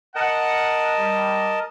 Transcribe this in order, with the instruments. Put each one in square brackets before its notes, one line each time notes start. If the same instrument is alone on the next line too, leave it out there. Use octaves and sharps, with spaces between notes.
[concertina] A#4 D#5 A5 [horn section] F#5
[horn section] G3